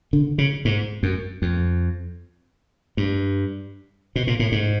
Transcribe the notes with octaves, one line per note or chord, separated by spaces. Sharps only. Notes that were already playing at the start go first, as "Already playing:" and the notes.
D3
C#3
G#2
F#2
F2
G2
B2
A#2
A2
G#2